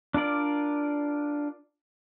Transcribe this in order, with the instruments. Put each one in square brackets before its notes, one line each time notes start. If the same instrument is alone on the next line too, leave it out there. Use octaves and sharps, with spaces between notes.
[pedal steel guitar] D4 F4 A#4 D5